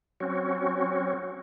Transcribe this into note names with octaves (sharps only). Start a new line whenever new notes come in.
F#3 C4 C#4 F#4